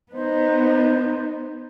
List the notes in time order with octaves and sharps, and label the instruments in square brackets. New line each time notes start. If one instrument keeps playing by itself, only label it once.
[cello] B3 D#4 [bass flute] C5